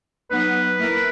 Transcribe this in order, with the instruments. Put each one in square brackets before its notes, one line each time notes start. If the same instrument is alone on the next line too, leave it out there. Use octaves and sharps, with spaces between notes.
[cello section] F#3 B3 D#4 [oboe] B4
[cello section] A#3 E4 A#4